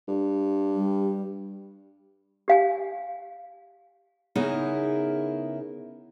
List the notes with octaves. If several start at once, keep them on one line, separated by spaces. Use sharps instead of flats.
G2
G3
G4 F5 G#5
C#3 B3 D#4 E4 G#4 A#4